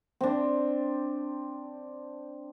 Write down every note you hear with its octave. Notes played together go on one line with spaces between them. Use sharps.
C4 D4